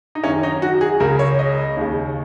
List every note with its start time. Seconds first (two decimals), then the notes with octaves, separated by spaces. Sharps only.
0.15 D#4
0.23 F#2 C#4
0.27 D#3
0.43 D#4
0.62 F#4
0.81 G#4
1.00 C#2 C#3 A#4
1.19 C#5
1.39 D#5
1.77 D#2 C#3